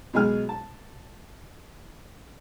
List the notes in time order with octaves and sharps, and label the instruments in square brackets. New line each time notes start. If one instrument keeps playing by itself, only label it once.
[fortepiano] B2 F#3 G#3 G#4 G#5 F6
A5